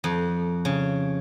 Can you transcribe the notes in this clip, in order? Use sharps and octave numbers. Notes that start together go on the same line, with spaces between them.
F2
C#3